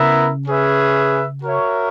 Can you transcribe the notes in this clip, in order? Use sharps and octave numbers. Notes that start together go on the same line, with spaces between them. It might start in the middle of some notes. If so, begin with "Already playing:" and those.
Already playing: C#3 B3 E4 A#4 E5
C#4 G#4 B4 E5
F#4 A#4 C#5 E5